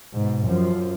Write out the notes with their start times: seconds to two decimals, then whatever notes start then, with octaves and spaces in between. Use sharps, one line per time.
0.16 G#2 B2
0.46 F#2 F3